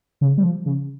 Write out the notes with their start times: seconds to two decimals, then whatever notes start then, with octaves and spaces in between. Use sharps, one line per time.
0.21 C#3
0.38 G3
0.43 F3
0.66 C#3